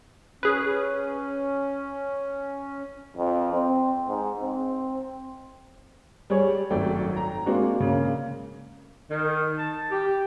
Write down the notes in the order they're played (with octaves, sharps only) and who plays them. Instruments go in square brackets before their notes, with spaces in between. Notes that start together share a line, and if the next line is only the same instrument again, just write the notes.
[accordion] C#4 [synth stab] G#4 B4
[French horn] F2
C4
G#2
C4
[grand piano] G3 G#4 C#5
G#1 F#2 A3 D5 G5
A#5
G#3 A#3 C4 D4 F#4
C#3 A#3
[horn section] D#3
A5
G4